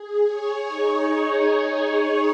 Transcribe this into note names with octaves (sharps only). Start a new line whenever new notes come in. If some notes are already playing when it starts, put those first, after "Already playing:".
Already playing: G#4
C#5
D#4